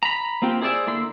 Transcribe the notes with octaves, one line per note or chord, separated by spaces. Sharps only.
A#5 B5
A#3 C4 F4 G4
E4 G#4 C5 D5 E5
D3 A#3 E4 C6 E6